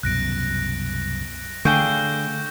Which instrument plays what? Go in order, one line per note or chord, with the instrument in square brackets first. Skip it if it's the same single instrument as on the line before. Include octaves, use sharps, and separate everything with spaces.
[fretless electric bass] C2 F#2 B2 [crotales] F#6 A#6 D7
[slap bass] D3 [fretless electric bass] A3 [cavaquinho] G#4 F5 G5 [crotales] C#6 G6 G7